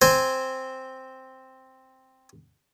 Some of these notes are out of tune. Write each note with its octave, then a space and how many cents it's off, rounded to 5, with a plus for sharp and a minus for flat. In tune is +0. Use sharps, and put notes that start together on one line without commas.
C4 +0 C5 +0 G#5 +0